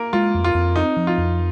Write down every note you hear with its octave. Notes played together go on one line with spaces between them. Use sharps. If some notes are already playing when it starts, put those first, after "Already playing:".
Already playing: A#3 A#4
G#3 F4
F2
F4
F2
C4 D#4
F3
F4
F2